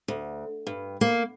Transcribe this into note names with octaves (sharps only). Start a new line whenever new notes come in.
D2
G2
A#3